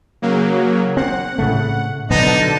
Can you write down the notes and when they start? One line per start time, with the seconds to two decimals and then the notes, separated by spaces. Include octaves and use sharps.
0.22 C#3 F#3 A#3
0.97 C4 F#5
1.38 A2 C#3 A3
2.10 B2 D3 F#3 B3 D#4 A5